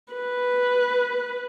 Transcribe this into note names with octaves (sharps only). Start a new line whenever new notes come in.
B4